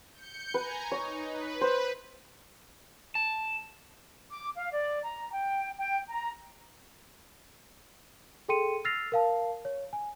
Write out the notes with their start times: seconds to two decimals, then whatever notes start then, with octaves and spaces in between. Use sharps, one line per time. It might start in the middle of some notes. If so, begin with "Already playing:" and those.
0.13 G6 C#7
0.54 B4 G#5 A#5
0.91 D#4 C#5
1.23 B4
1.61 C5
3.15 A5
4.30 D6
4.56 F5
4.72 D5
5.02 A#5
5.32 G5
5.78 G5
6.09 A#5
8.49 G#4 A4 G5 C6 C#7 D#7
8.85 E6 F6 A6 A#6 C7 F7
9.12 A#4 F5 A5
9.65 C#5
9.93 G#5